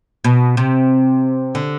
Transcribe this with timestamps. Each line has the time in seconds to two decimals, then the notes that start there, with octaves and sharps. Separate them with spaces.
0.24 B2
0.57 C3
1.55 D3